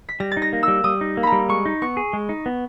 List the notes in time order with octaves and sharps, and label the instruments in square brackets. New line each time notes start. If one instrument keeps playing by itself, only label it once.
[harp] B6
[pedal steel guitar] G3 [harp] A#6
[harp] A6
[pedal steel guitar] D#4
[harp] A#6
[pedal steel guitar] A#3
[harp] E6
[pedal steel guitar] G3
[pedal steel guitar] G3 [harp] D#6
[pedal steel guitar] D#4
A#3
[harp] A#5 B5
[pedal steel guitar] G3
[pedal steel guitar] G#3 [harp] C#6
[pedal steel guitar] D#4
[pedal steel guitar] B3 [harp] C#6
[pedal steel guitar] G#4
G#3
D#4
B3